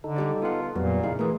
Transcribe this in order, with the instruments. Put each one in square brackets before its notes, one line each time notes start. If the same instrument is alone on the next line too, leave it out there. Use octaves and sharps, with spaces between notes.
[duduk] D3 [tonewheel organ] D#4 A4
[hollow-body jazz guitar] G3 G4 D5
[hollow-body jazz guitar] B3 F#5 [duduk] F4
[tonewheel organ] F2 G3 B3 [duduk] A#2 [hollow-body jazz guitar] F#3
[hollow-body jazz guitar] C#3 G#4 [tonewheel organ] D#4 E4 F5
[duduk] E3 [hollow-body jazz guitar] A3 G#4 [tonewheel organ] A#4